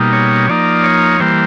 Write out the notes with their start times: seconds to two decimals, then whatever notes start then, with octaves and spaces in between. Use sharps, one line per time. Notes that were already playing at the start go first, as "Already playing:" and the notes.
Already playing: B2 G3 A#3 D#4
0.13 C#5
0.49 F3 A#3 D#4 D5
0.83 C#5
1.20 E3 G3 A#3 C5